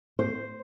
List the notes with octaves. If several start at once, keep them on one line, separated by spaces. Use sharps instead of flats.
C5